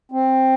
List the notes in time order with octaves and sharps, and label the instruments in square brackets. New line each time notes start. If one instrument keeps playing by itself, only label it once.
[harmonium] C4